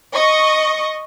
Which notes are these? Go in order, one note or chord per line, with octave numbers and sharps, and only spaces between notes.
D#5 C#6